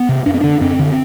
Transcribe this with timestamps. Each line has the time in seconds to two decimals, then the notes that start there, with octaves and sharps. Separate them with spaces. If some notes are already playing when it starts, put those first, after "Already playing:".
Already playing: B3
0.09 C3
0.26 F#2 D4
0.34 C4
0.41 D3 D4
0.61 F#2 C4
0.79 D3